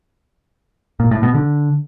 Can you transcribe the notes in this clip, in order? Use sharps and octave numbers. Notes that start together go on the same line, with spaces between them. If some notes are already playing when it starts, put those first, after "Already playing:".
A#2
A2
B2
D3